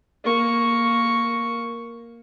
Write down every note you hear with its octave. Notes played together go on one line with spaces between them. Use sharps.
A#3 C#6